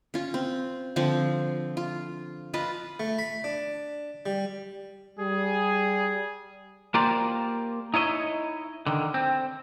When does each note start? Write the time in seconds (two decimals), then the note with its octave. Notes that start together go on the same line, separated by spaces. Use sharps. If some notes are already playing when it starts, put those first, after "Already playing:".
0.14 C#4 F4
0.34 C4
0.96 D3 F3 C4
1.77 F4
2.54 F4 B4 D#5 A5
3.00 A3
3.19 B5
3.44 D4
4.26 G3
5.19 G3 G#4
6.94 A#3 F4 G4 A#4 C5 D5
7.94 D#4 E4 C#5 D#5
8.87 D3 D#3
9.14 C4